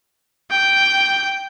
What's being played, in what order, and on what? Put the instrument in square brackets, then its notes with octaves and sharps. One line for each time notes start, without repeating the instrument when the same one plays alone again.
[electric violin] G5